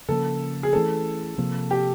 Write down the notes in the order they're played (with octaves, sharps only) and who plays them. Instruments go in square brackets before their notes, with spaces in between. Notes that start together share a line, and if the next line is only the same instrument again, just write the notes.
[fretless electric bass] C#3 F3 A#3 C#4 [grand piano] A4
[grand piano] G#4
[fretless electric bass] E3 A3 C#4 [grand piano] A4
[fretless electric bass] C3 F3 A#3
[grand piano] G4